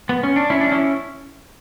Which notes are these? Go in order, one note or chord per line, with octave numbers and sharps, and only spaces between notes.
B3
C#4
D4
C#4 E4
D4
C#4 E4